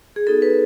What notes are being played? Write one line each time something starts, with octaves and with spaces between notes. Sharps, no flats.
G#4
B3 D#4 F#4 A4
B4